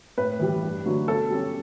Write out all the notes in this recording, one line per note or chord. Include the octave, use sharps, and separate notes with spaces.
A2 B4
E3 G3
G2
D3 F#3 A3
B2 A4
G3 C#4